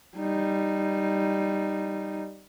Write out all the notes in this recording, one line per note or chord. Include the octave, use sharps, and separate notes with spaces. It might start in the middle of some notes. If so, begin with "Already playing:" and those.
G3 D#4